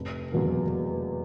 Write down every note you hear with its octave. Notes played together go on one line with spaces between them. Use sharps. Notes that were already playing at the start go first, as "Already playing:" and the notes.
Already playing: F1
E2 B2 F#3 A#3